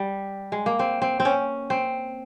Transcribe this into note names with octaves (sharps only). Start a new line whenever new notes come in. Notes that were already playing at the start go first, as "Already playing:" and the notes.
Already playing: G3
G#3
A#3
C4
C4
C4
C#4
C4